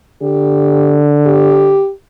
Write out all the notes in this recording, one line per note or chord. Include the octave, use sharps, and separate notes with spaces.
D3 G4
G4